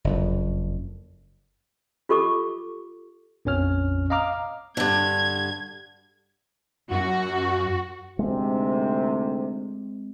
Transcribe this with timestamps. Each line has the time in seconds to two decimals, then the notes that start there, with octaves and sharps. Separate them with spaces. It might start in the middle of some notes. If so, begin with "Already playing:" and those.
0.04 F#1 F2
2.09 F4 G4 A4 C#6 D6
3.45 A#1 F2 C#4 C#5 F6
4.10 D#5 F5 A#5 D6 F6
4.77 G2 D3 G#6
6.91 F#2 F#4
8.19 D2 G#2 C3 G#3 C4